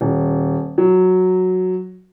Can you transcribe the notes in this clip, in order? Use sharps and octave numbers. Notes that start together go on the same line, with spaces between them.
D#1
F#3